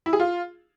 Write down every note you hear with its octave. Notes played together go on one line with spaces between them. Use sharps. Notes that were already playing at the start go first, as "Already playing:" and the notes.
E4
G#4
F4